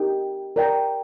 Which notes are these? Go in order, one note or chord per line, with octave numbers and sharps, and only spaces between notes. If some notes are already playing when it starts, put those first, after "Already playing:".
Already playing: D#4 G4 A#4 D#5 G5
A#4 D5 G5 A#5